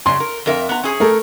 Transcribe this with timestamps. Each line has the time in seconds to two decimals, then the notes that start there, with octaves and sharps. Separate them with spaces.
0.06 F#2 C#3 C6
0.20 A#4
0.46 F2 A#4 E5
0.69 B3 A#5
0.83 C#4 G#4
1.00 A3 A4 A#4